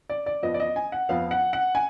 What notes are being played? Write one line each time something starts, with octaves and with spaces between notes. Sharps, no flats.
D5
D5
F2 F3 B3 D#5
D5
D#5
G#5
F#5
F2 F3 B3 F5
F#5
F#5
G#5